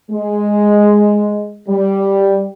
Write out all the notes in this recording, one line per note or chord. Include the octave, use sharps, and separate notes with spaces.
G#3
G3